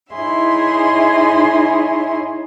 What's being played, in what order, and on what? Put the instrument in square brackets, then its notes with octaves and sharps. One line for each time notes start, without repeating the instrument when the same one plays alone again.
[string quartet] D#4 E4 G#4 C#5 E5 C6